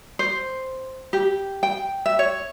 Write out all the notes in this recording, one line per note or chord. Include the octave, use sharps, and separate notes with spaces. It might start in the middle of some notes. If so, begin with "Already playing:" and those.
C5
G4
G5
E5
C#5